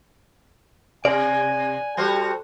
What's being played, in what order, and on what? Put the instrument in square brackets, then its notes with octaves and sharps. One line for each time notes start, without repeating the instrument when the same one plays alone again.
[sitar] C3 [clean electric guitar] D5 [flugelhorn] G#5
[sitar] G3 F#4 C5 [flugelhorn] A4